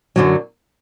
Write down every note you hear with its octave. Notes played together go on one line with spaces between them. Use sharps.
F#2 D3 F#3